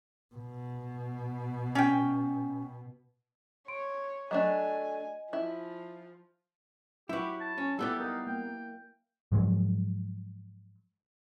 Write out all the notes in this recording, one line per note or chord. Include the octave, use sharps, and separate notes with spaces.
B2
C#4 G5
C#5 C6 D7
F#3 A3 D4 D#5 G#5
F3 E4
F#3 E4 F#4 G4 B4
A5
C#4
G3 B3 E4 G4 A4 D5
D#4 A#4 F5
A#3 G5
G#2 F3 F#3 G#3